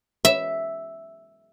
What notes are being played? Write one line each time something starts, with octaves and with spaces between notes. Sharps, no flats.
E5